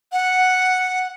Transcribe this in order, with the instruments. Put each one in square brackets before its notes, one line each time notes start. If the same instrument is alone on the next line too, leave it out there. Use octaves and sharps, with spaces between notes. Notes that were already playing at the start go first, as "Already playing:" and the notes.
[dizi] F#5